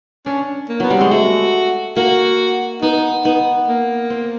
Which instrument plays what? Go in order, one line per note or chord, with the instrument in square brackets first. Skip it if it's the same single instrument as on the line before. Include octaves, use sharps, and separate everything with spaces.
[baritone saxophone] C#4 [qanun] D4
[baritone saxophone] A#3
[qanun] F#3 [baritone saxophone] B3
[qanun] G3
[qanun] G#3 [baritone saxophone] C4
[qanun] A3 [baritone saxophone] F#4
[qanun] A#3 [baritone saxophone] F#4
[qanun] B3 [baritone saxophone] D#4
[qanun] B3 [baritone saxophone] D#4
[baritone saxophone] A#3
[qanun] C4